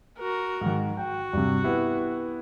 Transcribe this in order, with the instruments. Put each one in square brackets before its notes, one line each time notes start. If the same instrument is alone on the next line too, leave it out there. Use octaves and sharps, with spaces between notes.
[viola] F#4 A#4
[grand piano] G#2 D#3
[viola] F#4 [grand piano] G5
[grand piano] G2 C3
B3 E4 G4